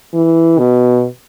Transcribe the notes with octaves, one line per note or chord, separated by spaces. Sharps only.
E3
B2